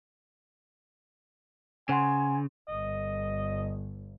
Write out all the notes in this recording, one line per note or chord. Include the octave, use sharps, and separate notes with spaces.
C#3 C5 F#5 G#5 C6
G1 D#5